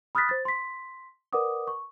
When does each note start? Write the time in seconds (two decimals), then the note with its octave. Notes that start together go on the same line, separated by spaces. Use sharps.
0.15 B5 D#6 F6 F#6 A6 B6
0.29 C5 A6
0.45 C6 B6
1.33 A#4 B4 D5 F#5 D6 D#6
1.67 C#6